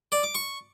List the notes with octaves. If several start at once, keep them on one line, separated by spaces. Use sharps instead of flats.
D5
D6
C#6